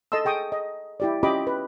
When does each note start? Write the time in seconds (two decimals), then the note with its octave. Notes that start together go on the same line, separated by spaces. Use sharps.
0.12 A4 D#5 A5 C6 E6
0.25 G#4 G5 C#6 D#6
0.52 D#5
1.00 E4 G4 D5
1.23 C#4 F4 G4 D#5 B5 D6
1.47 B4